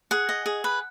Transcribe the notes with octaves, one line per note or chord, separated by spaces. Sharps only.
G#4 F#5
D#5
G#4
B4